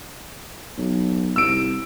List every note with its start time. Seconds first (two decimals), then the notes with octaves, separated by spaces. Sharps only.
0.78 B1
1.36 C2 E6 D7